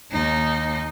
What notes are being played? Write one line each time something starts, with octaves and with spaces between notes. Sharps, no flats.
D#2 D#4